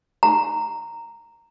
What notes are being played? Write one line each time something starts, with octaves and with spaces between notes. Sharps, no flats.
A#5